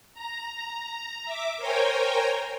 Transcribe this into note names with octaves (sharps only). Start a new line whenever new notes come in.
A#5
E5 D6
A#4 C5 C#5 G5 G#5 A#5